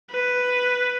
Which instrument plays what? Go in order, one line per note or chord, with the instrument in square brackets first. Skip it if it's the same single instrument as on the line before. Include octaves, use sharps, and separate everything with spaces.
[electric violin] B4